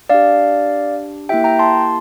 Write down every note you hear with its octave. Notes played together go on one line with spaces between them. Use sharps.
D4 G4 D5 F5
A#3 E4 G4 E5 G5
G5 A#5
A5 C6